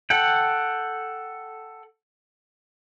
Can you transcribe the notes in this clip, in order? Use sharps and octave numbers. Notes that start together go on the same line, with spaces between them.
A4 F#5 G5